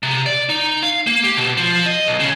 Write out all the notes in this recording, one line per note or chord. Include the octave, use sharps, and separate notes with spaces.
C3
D5
D#4
F5
A#3
G4
B2
F3
D#5
B1
C#3